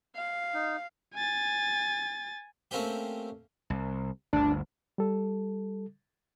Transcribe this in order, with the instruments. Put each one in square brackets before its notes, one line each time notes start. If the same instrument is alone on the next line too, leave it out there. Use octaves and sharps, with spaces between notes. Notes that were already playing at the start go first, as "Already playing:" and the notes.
[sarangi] F5
[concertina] D#4
[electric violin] G#5 A6
[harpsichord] A3 A#3 C4 C#4 G4
[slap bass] C2
[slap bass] G1 D2 [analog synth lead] D4
[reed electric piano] G3 A4